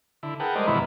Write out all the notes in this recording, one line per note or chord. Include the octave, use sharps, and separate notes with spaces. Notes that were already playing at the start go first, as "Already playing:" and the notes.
D3 E4
G#4 A#4 B4 F#5 G5 A5
G3 G#3 A#4 C5 D5 D#5
F2 B2 D#3 E3 E4 B4